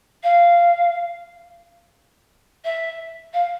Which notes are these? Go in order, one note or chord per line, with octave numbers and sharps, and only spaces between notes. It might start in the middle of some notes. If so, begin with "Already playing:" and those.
F5
E5
F5